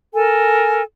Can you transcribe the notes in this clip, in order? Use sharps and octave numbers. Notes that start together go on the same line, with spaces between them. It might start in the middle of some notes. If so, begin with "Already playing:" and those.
A4 A#4 G#5